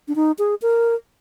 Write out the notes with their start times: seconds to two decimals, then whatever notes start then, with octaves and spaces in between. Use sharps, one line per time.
0.08 D4
0.16 D#4
0.39 G#4
0.62 A#4